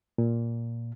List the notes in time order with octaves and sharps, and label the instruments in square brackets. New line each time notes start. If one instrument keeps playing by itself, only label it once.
[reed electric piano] A#2